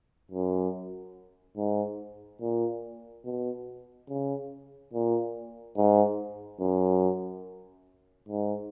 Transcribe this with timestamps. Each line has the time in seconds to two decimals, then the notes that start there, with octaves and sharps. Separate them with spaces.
0.31 F#2
1.57 G#2
2.41 A#2
3.25 B2
4.09 C#3
4.93 A#2
5.77 G#2
6.60 F#2
8.29 G#2